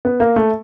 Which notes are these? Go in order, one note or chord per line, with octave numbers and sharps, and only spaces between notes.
B3
A#3
A3